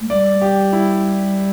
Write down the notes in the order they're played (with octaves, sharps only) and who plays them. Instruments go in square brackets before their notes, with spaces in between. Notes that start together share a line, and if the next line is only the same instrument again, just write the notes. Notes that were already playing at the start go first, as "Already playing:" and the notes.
[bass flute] A3
[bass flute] G3 [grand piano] D5
[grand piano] G4
E4